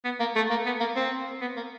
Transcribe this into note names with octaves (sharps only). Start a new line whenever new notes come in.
B3
A#3
A3
A#3
B3
A#3
C4
B3
A#3